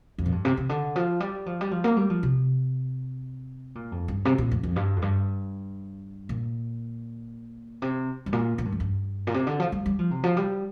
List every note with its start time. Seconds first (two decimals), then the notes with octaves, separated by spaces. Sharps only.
0.18 F2
0.26 A#2
0.32 G2
0.45 C3
0.57 C3
0.69 D3
0.96 F3
1.20 G3
1.46 F3
1.61 G3
1.71 F3
1.84 A#3
1.97 G3
2.10 F3
2.23 C3
3.75 A#2
3.92 F2
4.08 G2
4.25 C3
4.38 A#2
4.51 F2
4.63 F2
4.76 G2
4.96 F2
5.02 G2
6.29 A#2
7.82 C3
8.26 G2
8.33 A#2
8.58 A#2
8.65 G2
8.72 F2
8.80 G2
9.27 A#2
9.34 C3
9.47 D3
9.60 F3
9.72 G3
9.86 G3
9.99 F3
10.11 C3
10.23 F3
10.37 G3